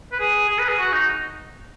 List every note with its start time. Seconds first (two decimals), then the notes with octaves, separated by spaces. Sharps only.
0.12 B4
0.20 G#4
0.49 G#4
0.59 B4
0.68 G#4
0.78 F#4
0.92 D#4